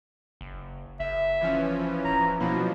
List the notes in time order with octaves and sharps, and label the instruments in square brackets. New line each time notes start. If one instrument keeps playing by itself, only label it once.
[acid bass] F#1
[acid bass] F#1 [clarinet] E5
[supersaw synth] E3 F3 C#4
[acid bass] D1 [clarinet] A#5
[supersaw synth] B2 F3 F#3 [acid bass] A#3 [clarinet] E4